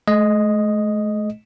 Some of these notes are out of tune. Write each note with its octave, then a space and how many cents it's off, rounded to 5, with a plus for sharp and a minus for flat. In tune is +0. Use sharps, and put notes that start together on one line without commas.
A3 -45 D#5 +0